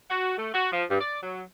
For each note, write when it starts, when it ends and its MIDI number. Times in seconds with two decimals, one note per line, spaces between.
0.09 0.33 66
0.37 0.52 57
0.54 0.70 66
0.71 0.83 53
0.89 0.97 43
1.00 1.18 74
1.22 1.41 54